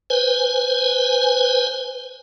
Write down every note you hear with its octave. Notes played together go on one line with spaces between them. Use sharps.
B4 C5 G#5